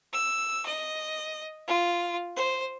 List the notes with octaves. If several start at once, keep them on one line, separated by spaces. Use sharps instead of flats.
E6
D#5
F4
C5